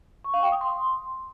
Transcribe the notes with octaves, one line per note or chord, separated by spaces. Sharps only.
C#6
F5
G5
D#6
C6